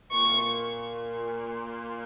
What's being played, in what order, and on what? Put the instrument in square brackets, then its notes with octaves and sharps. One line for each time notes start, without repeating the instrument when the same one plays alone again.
[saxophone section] A#2 [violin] C#6